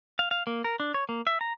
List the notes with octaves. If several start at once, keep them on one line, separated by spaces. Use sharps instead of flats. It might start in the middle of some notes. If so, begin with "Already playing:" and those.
F5
F5
A#3
A#4
D4
C#5
A#3
E5
A#5